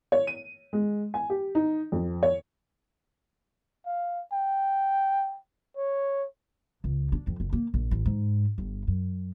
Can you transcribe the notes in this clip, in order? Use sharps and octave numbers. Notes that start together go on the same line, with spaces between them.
C#5
D#7
G#3
G#5
G4
D#4
F2
C#5
F5
G5
C#5
C#2
D4
F2
F#1
A#3
A#1
A1
G#2
G1
F#2